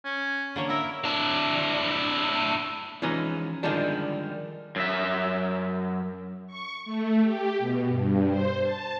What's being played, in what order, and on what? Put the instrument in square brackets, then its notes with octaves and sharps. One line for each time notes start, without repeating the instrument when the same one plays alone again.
[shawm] C#4
[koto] D3 A#3 C#5
[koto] E4 A#4 [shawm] E5
[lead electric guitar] D4 E4
[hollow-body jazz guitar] E3 F3 G#3 C#4 D#4
D3 D#3 F3 G3 G#3 D4
[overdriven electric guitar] F#2 E5
[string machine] C#6
A3
G4
B2
G2
C5
A5